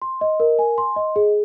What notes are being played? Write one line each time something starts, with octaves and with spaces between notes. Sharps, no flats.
C6
D#5
A#4
G#5
C6
D#5
G#4